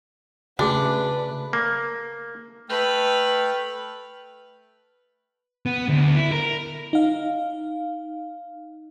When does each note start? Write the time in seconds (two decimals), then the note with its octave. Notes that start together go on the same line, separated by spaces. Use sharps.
0.59 C#3 A3 D4 F#4 G#4 B4 G#5
1.53 A#3
2.69 A3 B4 G5 F6
5.66 B3
5.88 D2
6.16 E4
6.32 A#4
6.93 D#4 F5